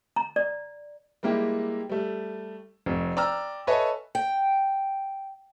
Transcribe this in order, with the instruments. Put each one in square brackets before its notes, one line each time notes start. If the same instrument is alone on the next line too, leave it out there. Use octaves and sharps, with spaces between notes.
[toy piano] A#5
D5
[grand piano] G3 G#3 A#3 E4 G4
G3 A3
F1 F2
D5 G5 A#5 E6 F6
A4 B4 C#5 D#5 E5 G#5
[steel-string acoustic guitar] G5